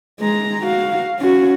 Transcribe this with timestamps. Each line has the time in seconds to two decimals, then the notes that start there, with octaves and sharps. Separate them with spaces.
0.21 G#3 A#5
0.65 F#4 F5
1.20 C#4 F#4